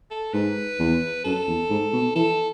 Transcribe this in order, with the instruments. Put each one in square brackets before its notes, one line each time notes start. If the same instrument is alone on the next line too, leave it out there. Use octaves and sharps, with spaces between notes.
[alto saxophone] A4
[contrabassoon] G#2 [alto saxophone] B4
[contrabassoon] E2
[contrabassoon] F#2 [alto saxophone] A4
[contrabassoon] E2
G#2
B2
[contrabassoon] E3 [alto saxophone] A4